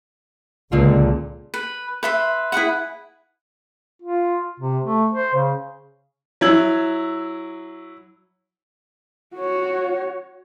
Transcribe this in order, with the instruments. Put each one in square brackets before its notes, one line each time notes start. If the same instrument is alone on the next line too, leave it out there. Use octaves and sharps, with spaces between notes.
[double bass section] C#2 [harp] A#2 D3 F4
[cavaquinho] B4
B4 E5 C6
E4 G#4 B4 F#5
[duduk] F4
C3
A3
C5
C#3
[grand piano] F#3 E4 E6 G#6 F#7
[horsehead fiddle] F#4 C#5